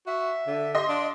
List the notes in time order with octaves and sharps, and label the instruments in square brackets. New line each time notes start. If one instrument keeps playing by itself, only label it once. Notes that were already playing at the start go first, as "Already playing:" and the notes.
[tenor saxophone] F#4 [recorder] E5
[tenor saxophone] D3
[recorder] G4 [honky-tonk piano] D#5 C6
[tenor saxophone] D4 [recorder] F5